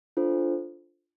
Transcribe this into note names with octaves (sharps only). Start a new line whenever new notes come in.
D4 F4 A4 C5